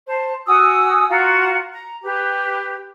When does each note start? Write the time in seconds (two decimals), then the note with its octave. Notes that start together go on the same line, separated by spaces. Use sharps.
0.07 C5 A5
0.47 F#4 G#5 D#6 E6
1.09 F4 F#4 F#5 A#5
1.72 A#5
2.04 G4 B4